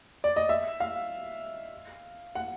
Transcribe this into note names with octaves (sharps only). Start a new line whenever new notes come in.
D5
D#5
E5
F5
F#5